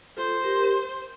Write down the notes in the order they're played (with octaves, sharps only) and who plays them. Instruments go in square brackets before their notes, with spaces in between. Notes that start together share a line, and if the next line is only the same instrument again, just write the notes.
[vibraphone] F4 A4 [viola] C5
[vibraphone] G4 A#4